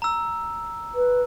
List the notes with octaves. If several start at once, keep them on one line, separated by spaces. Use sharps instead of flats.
A#5 E6
B4